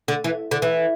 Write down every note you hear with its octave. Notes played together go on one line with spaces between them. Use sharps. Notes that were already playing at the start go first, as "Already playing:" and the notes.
D3
E3
D3
E3